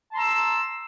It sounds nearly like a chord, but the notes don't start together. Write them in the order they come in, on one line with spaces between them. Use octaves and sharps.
A5 C6 A#5 E6